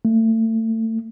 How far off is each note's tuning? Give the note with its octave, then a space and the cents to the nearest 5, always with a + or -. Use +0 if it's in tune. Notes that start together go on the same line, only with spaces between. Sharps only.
A3 +30